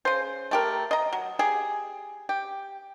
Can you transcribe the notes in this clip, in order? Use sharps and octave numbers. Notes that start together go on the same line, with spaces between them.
C#3 C5
A3 G4 A#4
D#5 A#5
F#3
G4 G#4
G4